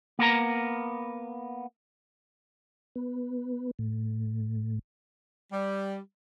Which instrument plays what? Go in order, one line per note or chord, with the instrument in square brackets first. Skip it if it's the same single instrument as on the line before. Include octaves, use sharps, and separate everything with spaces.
[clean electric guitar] A#3 B3 A#4 A#5
[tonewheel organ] B3
A2
[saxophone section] G3